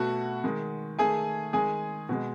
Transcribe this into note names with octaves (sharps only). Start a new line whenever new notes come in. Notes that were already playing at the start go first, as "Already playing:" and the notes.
Already playing: B2 A3 F#4 F#5
D#3 G#3
D#3 A3 G#4 G#5
D#3 G#3 G#4 G#5
B2 G#3